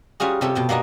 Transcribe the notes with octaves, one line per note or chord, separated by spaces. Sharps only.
G3 C#4 F4 F#4 G#4
C3 G3 G4 A4 C#5
B2 G5 A5
A#3 B3 D4 D#4 F#4